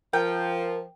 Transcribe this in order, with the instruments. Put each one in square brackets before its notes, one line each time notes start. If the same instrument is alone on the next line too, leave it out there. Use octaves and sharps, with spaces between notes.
[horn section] F3 [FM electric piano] A#4 [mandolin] G5